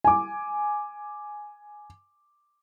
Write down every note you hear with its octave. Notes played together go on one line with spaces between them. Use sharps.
G#5 D6